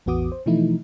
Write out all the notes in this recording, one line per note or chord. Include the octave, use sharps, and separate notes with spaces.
A1 E2 B3 F#4 D6 D#6
C5
B2 E3 F3 A3 D#4 E4